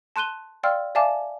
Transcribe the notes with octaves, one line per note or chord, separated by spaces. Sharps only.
A5 C6 F#6 D#7 G7
D5 F5 G5 C6 E6 F6
D5 E5 F5 G#5 A5 D6